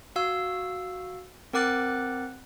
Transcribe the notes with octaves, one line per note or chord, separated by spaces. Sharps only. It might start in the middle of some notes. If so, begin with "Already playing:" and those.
F#4 F5 E6
C4 A#4 F#5 D6 F#6 A6